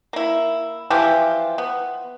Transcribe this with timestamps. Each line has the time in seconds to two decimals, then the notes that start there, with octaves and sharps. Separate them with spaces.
0.13 A#3 E4
0.90 E3 F3 F4 G4
1.58 B3